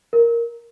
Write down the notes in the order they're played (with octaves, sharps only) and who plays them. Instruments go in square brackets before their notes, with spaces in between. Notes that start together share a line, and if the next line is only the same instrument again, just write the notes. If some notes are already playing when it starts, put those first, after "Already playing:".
[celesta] A#4